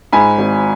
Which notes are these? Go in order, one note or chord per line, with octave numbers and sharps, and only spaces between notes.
G#2 G#5 B5
G#1